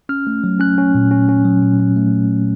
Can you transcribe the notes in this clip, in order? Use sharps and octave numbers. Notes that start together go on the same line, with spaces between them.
C#4 F6
A3
F#3
C#4 F#6
C#4
A#2
C#4
C#4
F#3
A#2
C#4
A3